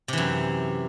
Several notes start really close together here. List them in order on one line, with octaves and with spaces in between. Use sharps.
C3 E3 F#2